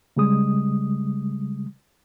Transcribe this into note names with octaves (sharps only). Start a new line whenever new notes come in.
C#3 G3 G#3 D#6